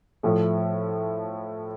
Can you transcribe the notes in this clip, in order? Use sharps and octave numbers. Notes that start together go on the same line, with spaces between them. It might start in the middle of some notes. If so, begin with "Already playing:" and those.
A2 F3 A3